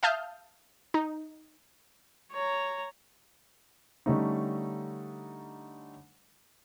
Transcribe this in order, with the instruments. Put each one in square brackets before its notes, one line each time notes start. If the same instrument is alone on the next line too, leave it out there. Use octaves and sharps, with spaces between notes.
[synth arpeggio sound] E5 F5 A5 D#6 F6 G6
D#4
[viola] C#5 A#5
[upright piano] D3 G3 A3 C#4 D#4